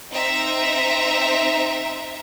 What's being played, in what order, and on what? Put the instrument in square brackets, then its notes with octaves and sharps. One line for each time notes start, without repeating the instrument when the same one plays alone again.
[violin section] C4 D#4 E5 A#5